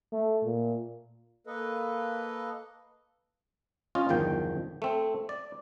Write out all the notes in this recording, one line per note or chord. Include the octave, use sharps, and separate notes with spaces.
A3
A#2
A#3 A4 B4 D#5
C#4 F4 D#5
G1 E2 D#3 F3 G5
A3 C4
D5